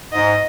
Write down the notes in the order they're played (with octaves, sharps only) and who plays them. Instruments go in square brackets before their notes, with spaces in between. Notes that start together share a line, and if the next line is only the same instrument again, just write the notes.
[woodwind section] G#2 [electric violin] D#5